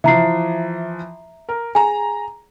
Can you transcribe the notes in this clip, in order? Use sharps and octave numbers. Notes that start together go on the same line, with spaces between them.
E3 F3 E5 A#5 C7
A#4
G#4 G#5 A#5